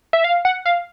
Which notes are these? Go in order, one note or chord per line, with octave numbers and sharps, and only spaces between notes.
E5
F5
F#5
F5